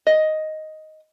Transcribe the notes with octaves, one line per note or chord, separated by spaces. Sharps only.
D#5